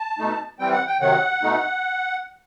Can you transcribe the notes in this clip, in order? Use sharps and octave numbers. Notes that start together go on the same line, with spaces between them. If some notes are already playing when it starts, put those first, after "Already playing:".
Already playing: A5
B2 A3 D#4
E3 G3 C4 G5
F#5
G5
C3 D#3 F#3 F#5
B2 A3 D#4